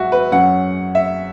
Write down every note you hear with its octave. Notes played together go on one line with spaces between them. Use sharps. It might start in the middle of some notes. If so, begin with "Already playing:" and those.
Already playing: G#2 F#3 F#4 E5
B4
F#2 F#3 C#4 F#5
E5